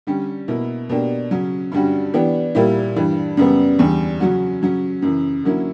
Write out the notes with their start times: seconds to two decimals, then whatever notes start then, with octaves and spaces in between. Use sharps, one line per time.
0.07 D3 G3 C#4 G4
0.48 B2 A#3 E4
0.89 B2 A#3 D4 G4
1.31 C#3 F#3 C#4
1.72 G2 D3 G3 C#4 F#4
2.14 E3 B3 D4 G4
2.55 A#2 G3 A#3 E4 G4
2.96 G2 E3 G3
3.37 F#2 C#3 G3 B3
3.79 E2 D3 G3
4.20 C#3 F#3 C#4 F#4
4.62 C#3 F#3 C#4
5.02 F#2 C#3 E3
5.44 D3 F#3 A#3 C#4 E4